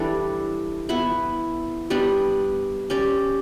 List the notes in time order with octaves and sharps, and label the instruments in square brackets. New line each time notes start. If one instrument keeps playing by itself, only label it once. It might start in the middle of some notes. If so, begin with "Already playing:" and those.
Already playing: [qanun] E3 G3 D4 A4
B3 E4 B4 E5
G3 B3 D4
C#4 G4 D5